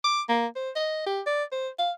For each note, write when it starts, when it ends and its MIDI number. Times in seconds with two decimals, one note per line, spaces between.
0.04 0.21 86
0.29 0.46 58
0.56 0.70 72
0.76 1.03 75
1.06 1.21 67
1.26 1.44 74
1.52 1.68 72
1.79 1.91 77